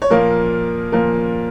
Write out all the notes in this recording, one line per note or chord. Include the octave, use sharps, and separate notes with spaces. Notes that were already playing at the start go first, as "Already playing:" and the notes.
C#5
A#2 F3 A#3 A#4
A#2 F3 A#3 A#4